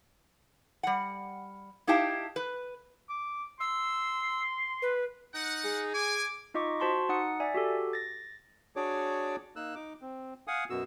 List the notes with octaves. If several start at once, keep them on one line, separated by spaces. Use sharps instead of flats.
G3 F#5
D#4 E4 G4 F5 G5 A5
B4
D6
C6 E6
B4
D#4 F#5
G#4
G#5 D6
D#4 F4 D#5 C#6 D6
F#4 C5 A5 C6 C#6
D#4 F#5 D#6 C#7
D5 E5 G#5
F#4 G4 A4
A6 A#6
D4 F#4 G#4 C#5 D5 D6
A#3 D#4 E6 F#6
D#4 D6
C4
F5 F#5 G#5 D#6
F#2 B2 B3 F#4 E6